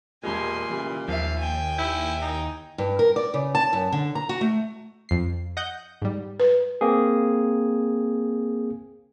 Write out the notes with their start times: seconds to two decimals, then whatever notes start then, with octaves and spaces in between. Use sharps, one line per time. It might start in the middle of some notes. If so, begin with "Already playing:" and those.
0.23 E1 A#2 G3 G#3 G#5 C6
0.70 C#3 E3 G3
1.08 D#2 F3 E5 F5
1.39 G5 G#5
1.78 E4 G6
2.22 D#4
2.78 G2
2.99 A#4
3.16 D5
3.34 C#3
3.55 A5
3.73 F#2
3.92 D3
4.15 A#5
4.29 F#4
4.41 A3
5.09 F2 C7
5.57 D#5 F#5 G6
6.02 G#2 G3
6.40 B4
6.81 A#3 C4 G#4